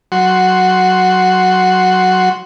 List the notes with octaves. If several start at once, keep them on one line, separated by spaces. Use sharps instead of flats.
F#3 F#4 C6